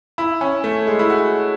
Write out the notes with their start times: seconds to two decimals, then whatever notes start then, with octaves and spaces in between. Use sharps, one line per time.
0.18 E4
0.41 C#4
0.64 A3
0.87 G#3
0.99 E4
1.10 F#4